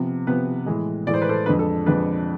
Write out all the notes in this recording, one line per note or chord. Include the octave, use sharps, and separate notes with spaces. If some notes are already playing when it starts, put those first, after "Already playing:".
Already playing: C3 F3 B3
C3 F3 B3 B4
A2 E3 G#3
A2 E3 G#3 D5
C5
B4
A4 C5
F2 D3 G#3 D4 B4
A4
F2 D3 G#3 D4 B4